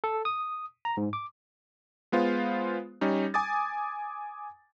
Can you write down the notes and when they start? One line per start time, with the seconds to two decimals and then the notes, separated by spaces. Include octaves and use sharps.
0.04 A4
0.25 D#6
0.85 A#5
0.97 G#2
1.13 D6
2.12 G#3 B3 F4 C5
3.01 G3 C#4 D#4
3.34 G#5 D6 D#6 A6